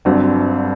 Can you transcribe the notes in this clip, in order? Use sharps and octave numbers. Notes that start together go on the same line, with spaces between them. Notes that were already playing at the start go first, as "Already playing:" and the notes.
G1 G2 F#3 C4